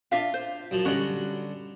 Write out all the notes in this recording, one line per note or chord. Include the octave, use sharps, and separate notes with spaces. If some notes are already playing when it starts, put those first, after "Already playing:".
D4 F4 E5 F5
C5
F#2 F3
D3 G3 C#4 F#4 D#5